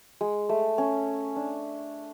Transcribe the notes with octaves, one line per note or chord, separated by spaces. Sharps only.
G#3
A3
C#4
D4